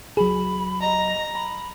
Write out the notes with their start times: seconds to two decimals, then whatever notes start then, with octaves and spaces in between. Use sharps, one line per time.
0.17 C#2 F#3 G#4 B5
0.82 D#5 A#5
1.34 B5